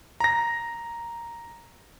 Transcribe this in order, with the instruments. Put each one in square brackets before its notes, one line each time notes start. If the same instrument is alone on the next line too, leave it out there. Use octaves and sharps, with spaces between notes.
[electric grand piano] A#5 A#6